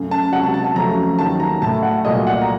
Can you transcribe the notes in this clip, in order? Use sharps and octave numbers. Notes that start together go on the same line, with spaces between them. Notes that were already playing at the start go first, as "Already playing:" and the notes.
Already playing: F#2 C#3 A3
A5
C#2 C3 F#3 F#5
A5
A5
A5
F2 C#3 F#3 A3 A#5
D#2 D#3 F#3 A5
A#5
A2 A3 A5
F#5
C2 A#2 F#3 A3 D#5
F#5
A#5